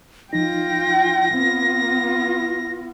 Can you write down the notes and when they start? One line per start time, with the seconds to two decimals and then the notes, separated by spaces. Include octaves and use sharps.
0.33 F3 D#4 F4 G5 A#6
1.34 B3 C4 F4